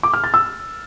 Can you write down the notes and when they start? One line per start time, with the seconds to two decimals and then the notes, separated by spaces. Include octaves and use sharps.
0.03 D6
0.14 F6
0.24 A6
0.34 E6